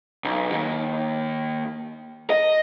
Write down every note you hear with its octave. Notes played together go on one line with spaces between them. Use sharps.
B1
D#2
D#5